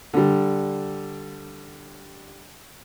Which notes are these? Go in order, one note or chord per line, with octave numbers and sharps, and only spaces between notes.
D3 G3